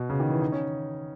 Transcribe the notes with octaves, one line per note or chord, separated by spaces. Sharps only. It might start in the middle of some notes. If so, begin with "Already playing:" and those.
Already playing: B2
C#3
D#3
E3
D#4
C#4